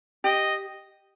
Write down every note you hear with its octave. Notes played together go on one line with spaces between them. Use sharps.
G4 D#5